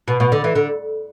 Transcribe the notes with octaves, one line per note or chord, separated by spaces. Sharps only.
B2
B2
D3
E3
D3